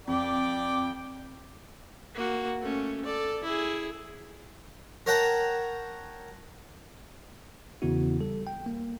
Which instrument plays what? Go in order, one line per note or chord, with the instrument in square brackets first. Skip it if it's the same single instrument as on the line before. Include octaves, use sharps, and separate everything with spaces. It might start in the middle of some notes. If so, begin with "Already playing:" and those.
[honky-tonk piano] F2 [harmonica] D5 G5 D6
[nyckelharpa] A#3 F#4
A3 C#4
A4 D5
E4 G#4
[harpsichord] A#4 C#5 F#5 G5 A5 A#5
[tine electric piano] E2 C#3 E3 B3 E4 F#4
G3 A4
G5
A#3